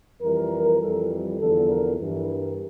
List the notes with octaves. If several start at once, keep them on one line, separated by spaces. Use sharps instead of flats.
F2 E3 G3 A#4
F2 E3 G3 A4
E2 D3 F3 A4
A#4
G2 E3 G3 A#4